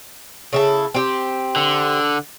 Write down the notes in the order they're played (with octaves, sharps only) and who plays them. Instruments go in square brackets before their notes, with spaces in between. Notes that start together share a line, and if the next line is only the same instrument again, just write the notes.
[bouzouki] C#3 E4 A4
C4 G4
[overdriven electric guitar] D3